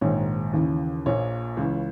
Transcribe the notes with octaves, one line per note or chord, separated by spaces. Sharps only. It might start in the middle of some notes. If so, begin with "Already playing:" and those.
A#1 G#2 D#3 C#5
D#2 C#3 E3
A#1 A#2 C#5
C#2 C#3 E3